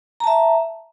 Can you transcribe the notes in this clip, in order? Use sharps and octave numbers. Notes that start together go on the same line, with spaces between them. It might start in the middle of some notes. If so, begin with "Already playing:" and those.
E5 A5 A#5